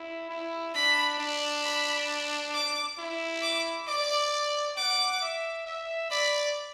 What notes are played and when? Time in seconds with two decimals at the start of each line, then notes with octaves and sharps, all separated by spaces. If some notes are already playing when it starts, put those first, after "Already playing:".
Already playing: E4
0.30 E4
0.75 D4 B5
1.19 D4
1.64 B5
2.54 D6
2.98 E4
3.42 D6
3.87 D5 D6
4.77 F#5 D6
5.21 E5
5.66 E5
6.11 D5 B5